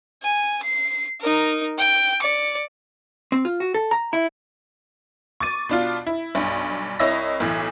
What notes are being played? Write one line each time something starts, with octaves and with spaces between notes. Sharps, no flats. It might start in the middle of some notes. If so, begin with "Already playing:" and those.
G#5
C7
D#4 A#4
G5
D5 C#7
C4
F4
F#4
A4
A#5
E4
C#6 D6 A6 D#7
B2 D4 F4
E4
B1 G2
C2 E4 C#5 D#5 E6 A#6
B1 A2 E3